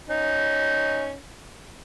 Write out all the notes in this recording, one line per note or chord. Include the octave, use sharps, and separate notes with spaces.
C#4 D#4